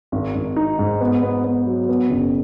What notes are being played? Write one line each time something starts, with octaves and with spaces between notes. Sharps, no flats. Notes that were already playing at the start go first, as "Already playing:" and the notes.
G#1
G#1
D#4
G#2
B3
B3
B3
F#3
B3
F#1